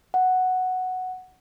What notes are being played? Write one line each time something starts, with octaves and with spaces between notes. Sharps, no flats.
F#5